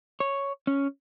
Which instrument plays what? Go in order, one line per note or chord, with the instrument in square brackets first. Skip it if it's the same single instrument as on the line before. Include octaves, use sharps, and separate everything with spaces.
[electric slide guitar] C#5
C#4